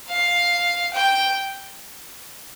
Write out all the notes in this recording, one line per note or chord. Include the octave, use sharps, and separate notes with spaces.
F5
G5